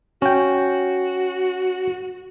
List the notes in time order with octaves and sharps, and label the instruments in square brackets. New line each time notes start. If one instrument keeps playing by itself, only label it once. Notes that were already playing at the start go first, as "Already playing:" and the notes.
[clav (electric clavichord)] C#4 G5 [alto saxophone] F#4